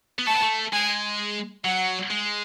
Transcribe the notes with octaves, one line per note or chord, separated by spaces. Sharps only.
B3
A3 A5
B3
A3
G#3 G#5
F#3 F#5
G#3